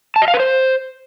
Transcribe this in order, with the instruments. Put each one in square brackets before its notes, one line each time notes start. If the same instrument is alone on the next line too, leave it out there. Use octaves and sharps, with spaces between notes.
[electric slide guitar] A5
D#5
F5
B4
C5